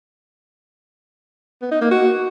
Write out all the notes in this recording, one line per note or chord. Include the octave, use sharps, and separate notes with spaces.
B3
D#4
A#3
F#4